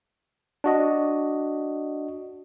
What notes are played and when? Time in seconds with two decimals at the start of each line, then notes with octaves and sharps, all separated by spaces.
0.64 D4 F#4 D#5